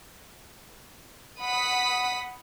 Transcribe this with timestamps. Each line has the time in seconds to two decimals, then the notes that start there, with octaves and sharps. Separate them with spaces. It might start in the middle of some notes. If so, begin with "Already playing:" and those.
1.41 F#5 B5 D#6 B6